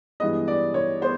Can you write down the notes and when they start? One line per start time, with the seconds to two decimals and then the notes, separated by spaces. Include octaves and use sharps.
0.20 G2 E3 G#3 B3 D#5
0.48 D5
0.74 C#5
1.01 B3 C5